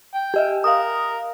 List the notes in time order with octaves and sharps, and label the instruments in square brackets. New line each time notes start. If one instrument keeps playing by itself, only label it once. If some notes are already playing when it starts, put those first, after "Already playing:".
[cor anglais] G5
[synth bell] G4 D#5 E5
[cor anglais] A#4 [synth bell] F5 D#6